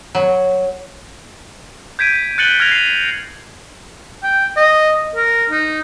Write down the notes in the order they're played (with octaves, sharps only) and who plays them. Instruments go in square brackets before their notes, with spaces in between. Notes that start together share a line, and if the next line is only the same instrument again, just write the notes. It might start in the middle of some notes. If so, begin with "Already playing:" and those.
[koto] F#3
[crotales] G6 G#6 B6 D7 D#7
F#6 A6 C#7 D#7 F#7 G7
F6 G#6 A#6 F7
C7 F7
[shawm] G5
D#5
A#4
D#4